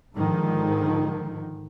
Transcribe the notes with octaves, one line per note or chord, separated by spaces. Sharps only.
G#2 D3 D#3 F3